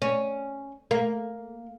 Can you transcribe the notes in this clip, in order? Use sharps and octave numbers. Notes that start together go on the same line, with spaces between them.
C#4
A#3